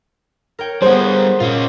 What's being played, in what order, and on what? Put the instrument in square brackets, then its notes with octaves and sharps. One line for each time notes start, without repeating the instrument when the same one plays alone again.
[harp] A#4 C#5 G5
[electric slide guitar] G3 B3 [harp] G#4 F#5 [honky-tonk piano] C5
[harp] A#2 [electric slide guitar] C#4 F4